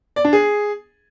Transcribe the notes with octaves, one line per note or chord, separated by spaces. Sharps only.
D5
D4
G#4